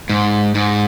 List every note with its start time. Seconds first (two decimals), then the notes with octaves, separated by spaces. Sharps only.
0.09 G#2
0.55 G#2